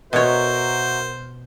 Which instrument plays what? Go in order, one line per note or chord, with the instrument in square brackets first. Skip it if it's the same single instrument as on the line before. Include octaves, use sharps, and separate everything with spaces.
[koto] B2 C#5 [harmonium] F#4 A#4 E5 [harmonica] C5